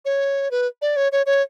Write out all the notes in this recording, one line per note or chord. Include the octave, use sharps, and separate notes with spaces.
C#5
B4
D5
C#5
C#5
C#5